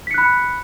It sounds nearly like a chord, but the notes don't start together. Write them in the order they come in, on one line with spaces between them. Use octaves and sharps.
B6 C#7 F#6 B5